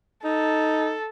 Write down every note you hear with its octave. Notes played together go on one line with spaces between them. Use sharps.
D#4 A4